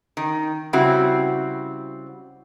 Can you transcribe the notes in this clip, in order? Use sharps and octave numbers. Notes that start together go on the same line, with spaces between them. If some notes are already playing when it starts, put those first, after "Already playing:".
D#3
C#3 G3 C4 E4 F#4